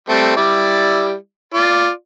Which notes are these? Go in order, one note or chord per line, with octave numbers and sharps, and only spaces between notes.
G3 A3 C4
G3 E4 D5
F4 D5